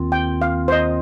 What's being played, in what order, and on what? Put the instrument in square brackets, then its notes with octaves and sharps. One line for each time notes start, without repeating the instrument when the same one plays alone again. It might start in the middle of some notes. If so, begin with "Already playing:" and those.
Already playing: [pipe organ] D#2 D#3 C4 F4
[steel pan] G5
F5
C5
D#5